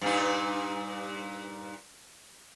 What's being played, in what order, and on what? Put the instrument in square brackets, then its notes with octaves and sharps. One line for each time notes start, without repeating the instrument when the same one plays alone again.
[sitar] G2 A#2 D#4